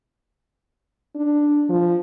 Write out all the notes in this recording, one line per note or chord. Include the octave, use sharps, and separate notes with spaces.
D4
F3